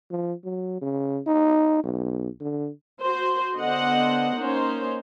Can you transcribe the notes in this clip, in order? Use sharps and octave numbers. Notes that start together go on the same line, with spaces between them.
F3
F#3
C#3
D#4
B1
D3
F#4 C5
D3 B3 C5 D#5 F#5
A#3 C#4 D#4 C5